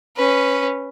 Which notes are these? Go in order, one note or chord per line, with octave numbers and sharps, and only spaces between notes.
C#4 B4